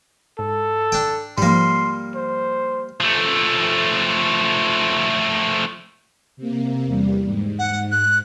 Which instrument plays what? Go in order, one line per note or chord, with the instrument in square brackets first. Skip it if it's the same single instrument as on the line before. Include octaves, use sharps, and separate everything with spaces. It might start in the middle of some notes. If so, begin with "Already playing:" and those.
[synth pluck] G#2 [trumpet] A4
[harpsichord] D4 G5
[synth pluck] G#2 F3 [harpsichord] G3 A#3 [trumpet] C6
[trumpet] C5
[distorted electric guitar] F3 A3
[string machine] C3 A#3
E2 G3
G#2
[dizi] F#5
F#6